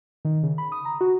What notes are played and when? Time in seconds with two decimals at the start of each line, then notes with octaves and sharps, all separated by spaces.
0.25 D#3
0.43 C#3
0.58 B5
0.72 D#6
0.85 A#5
1.01 F#4